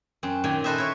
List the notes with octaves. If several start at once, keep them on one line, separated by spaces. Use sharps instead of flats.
F#2 C4
A#2 D#3 G5 G#5
A4 B4 C5 D#5 E5
E4 C#5